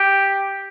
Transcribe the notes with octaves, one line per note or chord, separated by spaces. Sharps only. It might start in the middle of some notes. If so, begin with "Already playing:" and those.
Already playing: G4